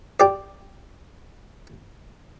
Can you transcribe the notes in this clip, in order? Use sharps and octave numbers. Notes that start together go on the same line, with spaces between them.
G4 D5